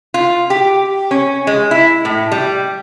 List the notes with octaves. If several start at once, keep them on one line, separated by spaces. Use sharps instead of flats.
F4
G4
C#4
G#3
E4
A2
G3